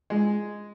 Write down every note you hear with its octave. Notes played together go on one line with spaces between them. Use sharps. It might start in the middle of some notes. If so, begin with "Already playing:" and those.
G#3